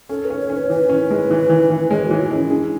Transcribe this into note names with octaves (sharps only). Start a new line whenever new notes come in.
C#4 A4
B4
C#4
C#5
C#4
B4
E3 B4
C#4
G#3
E3
E3
E3
G#3 C#5
F#4
E3
E4
G#3
C#4
D4 G#4